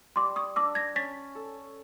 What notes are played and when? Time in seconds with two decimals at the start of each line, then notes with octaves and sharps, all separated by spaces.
0.16 G3 C6 D6
0.36 C#6 D#6
0.56 D4 D6 E6
0.75 G#6 A#6
0.95 C#4 A6 B6
1.35 A4